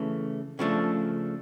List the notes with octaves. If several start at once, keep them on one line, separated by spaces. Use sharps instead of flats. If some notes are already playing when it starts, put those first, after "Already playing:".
Already playing: C#3 E3 A3
C#3 F3 A3 D4